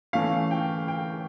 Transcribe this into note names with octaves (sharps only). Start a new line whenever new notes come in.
E3 A3 C#4 F5
G5
G5